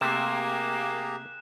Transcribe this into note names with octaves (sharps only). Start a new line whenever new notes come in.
C3 A3 A#3 G4 G#4 A#5 F#6 E7